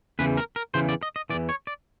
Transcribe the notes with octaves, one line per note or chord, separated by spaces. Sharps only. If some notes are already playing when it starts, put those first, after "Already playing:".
E2 C#3 E3 B4
A#4
A#4
E2 C#3 E3 C5
D5
D#5
D#5
E2 C#3 E3 D5
C#5
D5